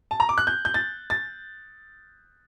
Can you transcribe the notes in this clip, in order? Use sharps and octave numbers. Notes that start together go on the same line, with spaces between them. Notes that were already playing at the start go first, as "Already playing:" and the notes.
A5
A#5
D6
F#6
G6
G6
A6
A6